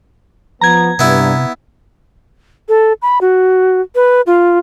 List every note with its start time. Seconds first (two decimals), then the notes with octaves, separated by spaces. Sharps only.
0.61 F3 B3 A#5 G#6
0.99 G2 C3 B3 E4
2.69 A4
3.02 B5
3.21 F#4
3.95 B4
4.27 F4